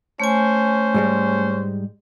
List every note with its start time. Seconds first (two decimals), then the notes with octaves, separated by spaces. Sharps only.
0.20 A3 C#4 C5 G#5
0.94 G#2 G3 G#3